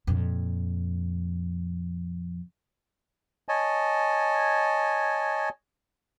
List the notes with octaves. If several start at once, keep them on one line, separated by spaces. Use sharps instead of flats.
F2 A#2
C#5 D#5 G#5 A5